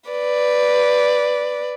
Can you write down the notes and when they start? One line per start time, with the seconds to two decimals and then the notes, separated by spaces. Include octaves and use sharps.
0.10 B4 D5